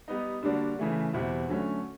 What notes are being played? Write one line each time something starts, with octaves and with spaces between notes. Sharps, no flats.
G3 B3 D#4
D3 G3 A#3 D4 F#4
C#3 E3 A3
E2 B2 G3 C4 E4
D3 F#3 A3 C#4